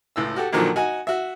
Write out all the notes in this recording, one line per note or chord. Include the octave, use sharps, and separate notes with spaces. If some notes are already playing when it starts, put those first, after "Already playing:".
C#2 A2 E6
F#4 G4 A4
A#2 D3 D#3 F3 F#3 A#3
D#4 F#4 G#5
F#4 E5